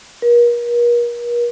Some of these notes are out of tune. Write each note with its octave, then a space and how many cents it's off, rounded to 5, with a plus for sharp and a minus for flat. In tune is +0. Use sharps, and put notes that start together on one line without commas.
A#4 +40